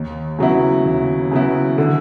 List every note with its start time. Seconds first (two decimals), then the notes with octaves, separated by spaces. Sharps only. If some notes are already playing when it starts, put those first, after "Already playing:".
Already playing: D#2
0.39 C#3 F#3 B3 E4
0.85 D#2
1.32 C#3 F#3 B3 E4
1.78 D3